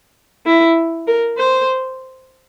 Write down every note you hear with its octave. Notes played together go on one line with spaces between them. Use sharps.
E4
A#4
C5